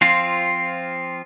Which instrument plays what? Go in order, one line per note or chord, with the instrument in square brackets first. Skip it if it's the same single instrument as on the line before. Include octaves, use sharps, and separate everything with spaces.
[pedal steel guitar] F3 C4 F4